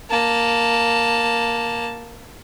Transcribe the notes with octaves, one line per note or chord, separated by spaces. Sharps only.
A#3 A5